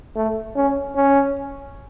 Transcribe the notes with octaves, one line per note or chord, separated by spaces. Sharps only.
A3
C#4
C#4